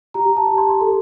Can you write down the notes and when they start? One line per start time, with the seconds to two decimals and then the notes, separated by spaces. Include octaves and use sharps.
0.14 G4 A#5
0.37 A5
0.48 G4
0.58 C6
0.81 A4